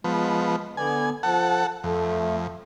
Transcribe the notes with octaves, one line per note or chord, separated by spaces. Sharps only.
F3 G#3 B3
D3 B3 D5 G#5
F3 A4 F#5
F2 A3